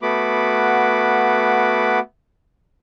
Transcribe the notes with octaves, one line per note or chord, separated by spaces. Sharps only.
A3 B3 F#4 B5 D6